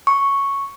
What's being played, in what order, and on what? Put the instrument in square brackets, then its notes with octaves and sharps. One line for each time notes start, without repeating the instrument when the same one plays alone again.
[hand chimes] C#6